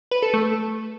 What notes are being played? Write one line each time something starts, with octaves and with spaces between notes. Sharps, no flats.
B4
A4
A3